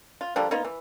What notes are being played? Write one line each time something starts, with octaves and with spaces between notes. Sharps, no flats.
F4
D3 F3 G3 A#3
A#3 B3 D#4 F4
E3